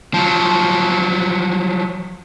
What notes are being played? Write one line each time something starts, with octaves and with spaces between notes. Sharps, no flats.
F3 F#3